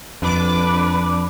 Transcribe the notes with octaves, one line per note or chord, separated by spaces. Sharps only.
F2 D4 B4 D6